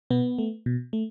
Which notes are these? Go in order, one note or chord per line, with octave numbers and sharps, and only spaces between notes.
B2 B3
A3
B2
A3